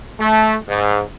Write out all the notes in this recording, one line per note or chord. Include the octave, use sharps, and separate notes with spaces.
A3
G#2